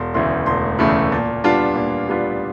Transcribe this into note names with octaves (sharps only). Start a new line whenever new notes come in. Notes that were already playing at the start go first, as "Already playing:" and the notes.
Already playing: E1 C6
D2 C#3 E3 A3 C6
E1 C6
D2 C#3 E3 A3 B5
A#2 A5
G3 B3 D4 F4 A5
A#2
G3 B3 D4 F4